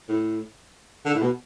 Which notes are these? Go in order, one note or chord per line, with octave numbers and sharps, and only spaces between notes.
A2
D3
A2
B2